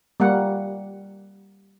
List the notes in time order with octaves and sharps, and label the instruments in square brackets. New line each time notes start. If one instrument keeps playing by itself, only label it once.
[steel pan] G3 A#3 F#5